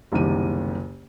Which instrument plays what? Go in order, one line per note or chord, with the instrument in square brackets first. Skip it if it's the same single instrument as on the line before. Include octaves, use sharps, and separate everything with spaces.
[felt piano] F#1 C2 D#3 G4 D#7